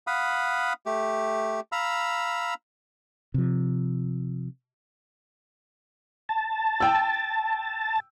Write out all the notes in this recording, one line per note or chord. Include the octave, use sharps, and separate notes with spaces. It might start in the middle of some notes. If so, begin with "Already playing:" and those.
F5 F#5 B5 D#6
A3 G4
F5 A#5 B5 E6
C3 F3
A5
G5 E6